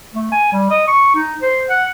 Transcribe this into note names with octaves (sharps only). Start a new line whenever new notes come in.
A3
G#5
G3
D#5
C#6
D#4
C5
F#5